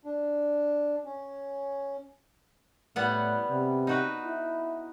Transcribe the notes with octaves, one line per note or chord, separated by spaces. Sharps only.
D4
C#4
A2 G3 B3 F#5
C3
D#4 F#4 B4
E4